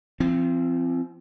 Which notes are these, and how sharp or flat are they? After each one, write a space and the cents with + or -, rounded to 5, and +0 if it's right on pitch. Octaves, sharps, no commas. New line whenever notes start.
F3 -40 C4 +0